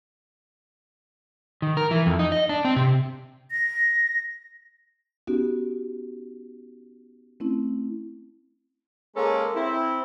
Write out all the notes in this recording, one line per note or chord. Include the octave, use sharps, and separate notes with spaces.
D#3
A#4
E3
F2
D#4
D#5
D4
C4
C3
A#6
B3 C#4 D#4 F#4 G4
A3 C4 C#4 E4
G#3 A#3 C#4 A4 A#4
C4 E4